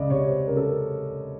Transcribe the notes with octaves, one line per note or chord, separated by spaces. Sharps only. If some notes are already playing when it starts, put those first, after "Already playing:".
Already playing: C#2 D5 D#5
C3 C#5
C5
C#2 A#4
A4
A#4